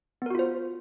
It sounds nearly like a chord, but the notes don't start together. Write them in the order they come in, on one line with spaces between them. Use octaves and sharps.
B3 A#4 F#4 F4 C5